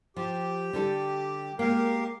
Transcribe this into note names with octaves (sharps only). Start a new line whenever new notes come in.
F3 G4
D3 G3 A4
G#3 A#3 G4 A#4 F5